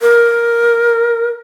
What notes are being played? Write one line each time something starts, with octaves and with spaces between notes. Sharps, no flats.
A#4